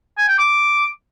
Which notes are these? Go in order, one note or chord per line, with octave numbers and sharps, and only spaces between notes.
G#5
G5
D6